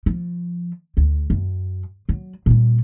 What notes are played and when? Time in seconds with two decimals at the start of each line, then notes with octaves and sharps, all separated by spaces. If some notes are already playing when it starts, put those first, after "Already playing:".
0.06 F3
0.97 D2
1.30 F#2
2.09 F#3
2.46 A#2 G3